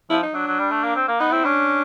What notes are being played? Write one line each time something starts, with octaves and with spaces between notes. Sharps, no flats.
F3 E4
D#4
F#3 D4
F#3
G3
A3
A#3
C4
A#3
B3 D#4
C4 E4
C#4 D4